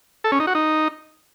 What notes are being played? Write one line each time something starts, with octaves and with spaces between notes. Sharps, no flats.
A4
C#4
D#4
F#4
D#4